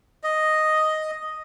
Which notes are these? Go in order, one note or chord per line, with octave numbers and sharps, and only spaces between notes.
D#5